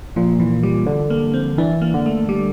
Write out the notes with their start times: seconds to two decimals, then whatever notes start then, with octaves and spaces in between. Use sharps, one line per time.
0.16 A#2 F3
0.40 E3
0.63 G3
0.86 D3
1.10 A#3
1.34 C4
1.58 E3 D4
1.82 A#3
1.94 D3
2.06 A3
2.29 G3